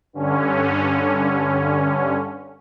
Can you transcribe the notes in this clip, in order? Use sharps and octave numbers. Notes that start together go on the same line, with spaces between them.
G2 D3 C#4